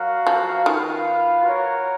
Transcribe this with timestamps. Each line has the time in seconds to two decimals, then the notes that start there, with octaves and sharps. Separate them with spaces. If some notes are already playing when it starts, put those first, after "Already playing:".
Already playing: F#3 F#4 A#4 F5
0.27 F3
0.65 D#3 F4 B4 F5
1.44 F#4 A#4 C#5